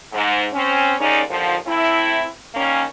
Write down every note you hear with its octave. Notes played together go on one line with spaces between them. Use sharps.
G#2
C4 C#4
D#2 G#3 C#4 D#4 D5
D#2 D3 F3
A3 C4 E4
D#3 G3 A#3 C#4